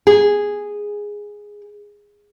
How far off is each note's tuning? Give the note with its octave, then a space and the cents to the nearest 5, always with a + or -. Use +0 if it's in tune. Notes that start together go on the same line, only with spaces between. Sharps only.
G#4 -5